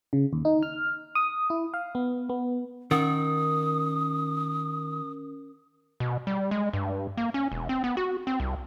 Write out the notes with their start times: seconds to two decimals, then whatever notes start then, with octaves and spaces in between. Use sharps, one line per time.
0.13 C#3
0.33 D#2
0.45 D#4
0.63 F6
1.15 D#6
1.50 E4
1.74 F5
1.95 B3
2.29 B3
2.91 D#3 C#4 A#4 D#6
6.00 B2
6.27 G3
6.51 G#3
6.73 G2
7.17 A#3
7.34 C#4
7.52 E1
7.69 C4
7.84 B3
7.97 F#4
8.27 C4
8.40 C2